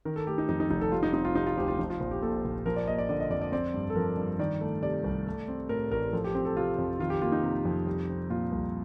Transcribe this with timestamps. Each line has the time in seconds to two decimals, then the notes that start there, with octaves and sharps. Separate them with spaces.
0.05 D#3 A#4
0.16 A4
0.27 A3 G4
0.38 D#4
0.49 F2 D#4
0.60 D#4
0.70 F1 D#4
0.81 A4
0.92 G3 F4
1.03 D#4
1.13 C4 D#4
1.25 F4
1.35 C3 D#4
1.47 F4
1.57 D2 G4
1.68 F4
1.79 F3 D#4
1.90 F4
2.00 A#1
2.11 G4
2.22 A#2 A4
2.44 A#1
2.66 F3 A#4
2.76 D5
2.87 A#3 D#5
2.98 D5
3.09 D3 D5
3.20 D#5
3.30 F2 D5
3.42 D5
3.52 C4 D5
3.74 G2
3.90 A4
3.96 F3 A#4
4.17 G2
4.39 D#3 D5
4.61 A3
4.83 C3 D5
5.04 C2
5.27 A3
5.48 C4
5.69 A2 A#4
5.91 A1 A#4
6.12 F3 A4
6.24 G4
6.35 C4 G4
6.45 A4
6.56 C3 F4
6.78 F2
6.99 D#3 F4
7.10 G4
7.21 A#3 F4
7.32 D#4
7.43 C3
7.65 F2
7.87 G3
8.09 C4
8.30 A#2 F4
8.52 C2